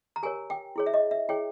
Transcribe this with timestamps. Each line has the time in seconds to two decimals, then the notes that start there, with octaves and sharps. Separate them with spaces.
0.16 A#5
0.23 G4 A#4 C#5 G#5
0.50 G5
0.76 E4 G#4 C#5
0.86 E5
0.94 D#5
1.11 E5
1.29 E4 G#4 C#5 G5